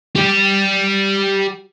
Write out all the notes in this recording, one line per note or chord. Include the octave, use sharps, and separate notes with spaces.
G4 D5